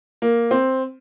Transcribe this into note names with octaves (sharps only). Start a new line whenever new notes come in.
A#3
C4